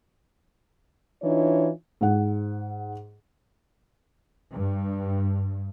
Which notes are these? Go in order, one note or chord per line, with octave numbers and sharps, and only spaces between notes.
E3 D4 D#4 F4 C#5
G#2 F#5
G2